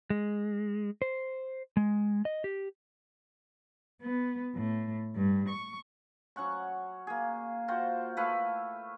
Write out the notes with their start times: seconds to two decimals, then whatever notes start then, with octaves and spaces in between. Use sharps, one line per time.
0.10 G#3
1.02 C5
1.77 G#3
2.25 D#5
2.44 G4
4.00 B3
4.55 A2
5.15 G2
5.49 C#6
6.36 F#3 C#4 F#5 C#6
7.07 A#3 G#4
7.68 F4 F#4 C5 G5
8.17 A3 E4 B4 F5